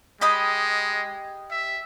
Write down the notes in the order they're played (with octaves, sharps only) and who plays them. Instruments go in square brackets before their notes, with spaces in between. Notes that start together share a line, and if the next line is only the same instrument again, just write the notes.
[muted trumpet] G#3 [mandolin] G4 D#5 B5
[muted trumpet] E5